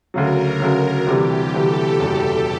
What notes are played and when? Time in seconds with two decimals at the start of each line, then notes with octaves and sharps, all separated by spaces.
0.14 D2 C#3 F#3 A#4
0.60 D2 C#3 F#3
1.07 D2 C3 E3 G3 G4
1.53 D2 C3 E3 G3 A4
2.00 F#1 E2 B2 G3